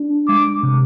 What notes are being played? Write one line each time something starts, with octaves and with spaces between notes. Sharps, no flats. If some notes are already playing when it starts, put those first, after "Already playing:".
Already playing: D4
G#3 D6
C3